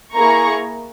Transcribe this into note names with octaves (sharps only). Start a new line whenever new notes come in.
A#3 E4 G#4 A#5 C#6